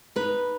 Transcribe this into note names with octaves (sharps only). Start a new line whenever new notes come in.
D#4 B4